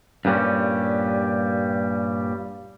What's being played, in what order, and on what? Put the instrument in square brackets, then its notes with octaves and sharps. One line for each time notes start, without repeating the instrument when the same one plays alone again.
[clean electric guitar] G2 A#2 G3 C#4